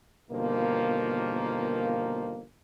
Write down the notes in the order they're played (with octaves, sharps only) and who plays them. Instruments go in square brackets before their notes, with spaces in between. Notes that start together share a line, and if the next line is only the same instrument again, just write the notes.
[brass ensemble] G1 B2 D#3 F3 A#3